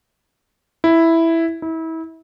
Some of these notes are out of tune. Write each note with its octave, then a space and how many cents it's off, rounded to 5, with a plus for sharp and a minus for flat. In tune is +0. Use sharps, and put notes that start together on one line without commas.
E4 +0
E4 -30